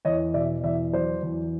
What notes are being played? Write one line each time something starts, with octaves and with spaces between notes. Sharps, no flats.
E2 C#5 D#5
B2 D5 E5
E2 D5 E5
F#3 C5 D5
E2